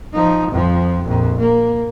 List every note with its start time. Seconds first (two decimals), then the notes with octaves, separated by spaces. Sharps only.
0.13 F3 D#4
0.51 F2 F3
1.04 A#1 F2
1.39 A#3